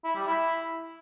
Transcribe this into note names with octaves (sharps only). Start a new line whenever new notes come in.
E4
G3
E4